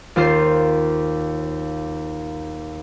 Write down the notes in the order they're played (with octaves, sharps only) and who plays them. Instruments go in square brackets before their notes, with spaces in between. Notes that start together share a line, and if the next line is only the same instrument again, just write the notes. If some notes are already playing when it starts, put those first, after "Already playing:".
[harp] D#2 F4 C5 F6 C7